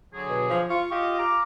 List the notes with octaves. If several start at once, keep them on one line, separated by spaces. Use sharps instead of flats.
D3 F#3 G#4
B2
F3
F4 C#6
F4 G4 D#5
F5 A#5 D6